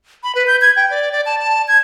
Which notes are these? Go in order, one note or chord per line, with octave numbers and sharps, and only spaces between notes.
B5
B4
G6
G#6
G5
D5
D5
A5
A5
G#6